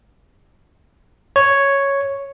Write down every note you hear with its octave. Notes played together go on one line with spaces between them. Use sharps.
C#5